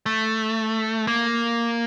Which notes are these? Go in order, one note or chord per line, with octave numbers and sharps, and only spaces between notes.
A3
A#3